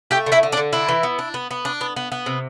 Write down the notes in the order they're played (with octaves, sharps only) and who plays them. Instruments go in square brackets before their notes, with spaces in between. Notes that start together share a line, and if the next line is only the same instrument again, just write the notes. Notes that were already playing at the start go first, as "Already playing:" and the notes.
[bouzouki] A3 G4 G5
D3
E4 E5
D3
D4 D5
D3
D4 E4
E3
B3
D4
B3
B3
D4
B3
B3
B3
C3